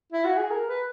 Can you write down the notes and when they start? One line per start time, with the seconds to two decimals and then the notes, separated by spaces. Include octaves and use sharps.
0.12 E4
0.24 F#4
0.37 G#4
0.50 A#4
0.68 B4